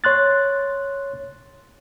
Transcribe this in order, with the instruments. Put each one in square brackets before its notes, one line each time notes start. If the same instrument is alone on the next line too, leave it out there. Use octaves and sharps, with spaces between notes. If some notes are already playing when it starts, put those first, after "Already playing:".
[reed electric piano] C#5 C6 F#6 A6